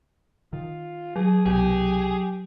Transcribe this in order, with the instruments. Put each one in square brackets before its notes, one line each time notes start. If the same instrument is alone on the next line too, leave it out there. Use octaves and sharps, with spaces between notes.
[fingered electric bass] D#3 [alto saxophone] F4
[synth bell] F#3 [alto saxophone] G#4
[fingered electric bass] C2 B2 [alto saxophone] G4 [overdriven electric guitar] G#4